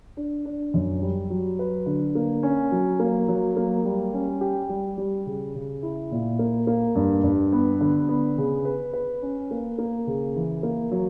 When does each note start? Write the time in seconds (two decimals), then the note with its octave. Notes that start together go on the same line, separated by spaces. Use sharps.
0.17 D4
0.45 D4
0.74 F#2
1.02 G3
1.30 F#3
1.59 B4
1.86 D3
2.15 A#3
2.43 C#4
2.72 F#3
3.00 A#3
3.28 F#3
3.57 A#3
3.84 G3
4.14 C#4
4.41 G4
4.69 G3
4.98 G3
5.26 C#3
5.55 C#3
5.83 E4
6.11 A#2
6.39 A#3
6.67 A#3
6.95 G2
7.23 G2
7.53 B3
7.81 D3
8.09 B3
8.38 C#3
8.65 B4
8.93 B4
9.22 C#4
9.51 A#3
9.78 A#3
10.07 C#3
10.36 E3
10.63 A#3
10.91 F#3